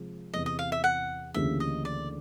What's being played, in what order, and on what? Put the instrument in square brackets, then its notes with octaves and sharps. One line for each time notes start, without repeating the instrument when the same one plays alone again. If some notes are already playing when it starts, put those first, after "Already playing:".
Already playing: [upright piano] C3 F3 G#3
[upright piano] E2 C3 E3 [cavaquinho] D#5
[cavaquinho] D#5
F5
E5
F#5
[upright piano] D2 C#3 E3 G3 A#3 [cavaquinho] E5
[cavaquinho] D#5
D5